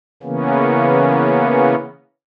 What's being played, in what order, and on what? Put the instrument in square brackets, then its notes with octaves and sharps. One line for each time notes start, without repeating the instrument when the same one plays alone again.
[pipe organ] C#3 E3 A#3 B3 C#4